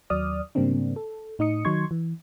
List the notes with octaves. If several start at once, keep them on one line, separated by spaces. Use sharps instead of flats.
D#2 F#3 D5 D#6 F6
G#2 C#3 G3 A#3 C4 D4
A4
A2 D#4 D#5 D#6 C#7
D#3 F#3 D#4 C6 C#6 G#6
E3